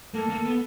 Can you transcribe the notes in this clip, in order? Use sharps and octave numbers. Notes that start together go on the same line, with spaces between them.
A#3 A4
A#3
B3